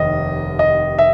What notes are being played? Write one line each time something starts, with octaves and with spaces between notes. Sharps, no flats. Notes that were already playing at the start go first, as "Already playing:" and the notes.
Already playing: F1 D#2 D#3 D#5
D#5
E5